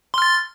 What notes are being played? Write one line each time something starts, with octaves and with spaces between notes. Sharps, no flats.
C6 F6 A6